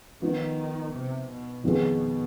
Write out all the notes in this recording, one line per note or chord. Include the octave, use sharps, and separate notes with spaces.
D#3 F3 B3 D#4
C3
B2
F2 B2 D#3 B3 F4 G#4